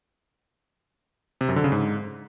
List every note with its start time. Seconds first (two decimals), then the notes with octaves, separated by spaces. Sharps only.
1.41 C3
1.48 F#2
1.56 D3
1.64 C#3
1.72 G#2